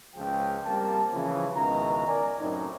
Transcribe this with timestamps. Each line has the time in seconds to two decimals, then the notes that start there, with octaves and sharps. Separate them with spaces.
0.16 C#2 F3 G#4 G5
0.65 G3 A#3 C4 A#4 A5
1.13 C#3 E3 F3
1.54 C#2 B2 D#3 E4 A#5
2.07 A#4 D5 G#5
2.39 F#2 A2 C4 D#4